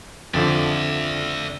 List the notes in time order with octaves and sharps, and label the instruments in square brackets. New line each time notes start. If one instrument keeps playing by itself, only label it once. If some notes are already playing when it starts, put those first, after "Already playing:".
[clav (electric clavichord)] F2 D3 F3 [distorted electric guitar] D5 E5